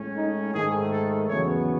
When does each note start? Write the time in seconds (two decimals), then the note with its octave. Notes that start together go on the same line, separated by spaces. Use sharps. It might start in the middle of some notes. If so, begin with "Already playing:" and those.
Already playing: A2 G#3 C#4
0.15 D#4
0.54 G#2 D#3 A3 G#4
0.91 A4
1.29 E2 C#3 F#3 B3 C#5